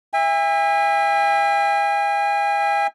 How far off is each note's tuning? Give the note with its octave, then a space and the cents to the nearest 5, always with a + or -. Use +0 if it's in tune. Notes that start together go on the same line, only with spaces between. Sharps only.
E5 +0 G#5 -40